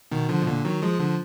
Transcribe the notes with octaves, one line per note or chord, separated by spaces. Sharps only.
B2 D#3
D3 F3
B2
A#2 D3
D#3 F#3
F3 G#3
D3 F3